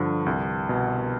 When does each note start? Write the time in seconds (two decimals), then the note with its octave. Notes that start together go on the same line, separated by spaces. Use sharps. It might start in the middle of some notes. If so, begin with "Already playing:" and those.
Already playing: G2 D3 F3
0.26 C2
0.69 B2